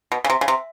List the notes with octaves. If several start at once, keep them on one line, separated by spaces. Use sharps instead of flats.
B2
C#3
C3
C#3
C3